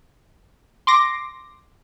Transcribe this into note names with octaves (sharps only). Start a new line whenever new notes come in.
C6 D6 A#6